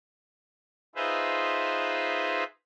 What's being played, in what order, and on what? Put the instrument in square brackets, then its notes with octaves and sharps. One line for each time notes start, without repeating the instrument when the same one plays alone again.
[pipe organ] D#4 F4 G#4 B4 C5 E5